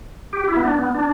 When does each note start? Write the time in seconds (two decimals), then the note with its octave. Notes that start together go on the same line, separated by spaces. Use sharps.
0.33 G4
0.48 E4
0.56 B3
0.64 D4
0.78 B3
0.95 D4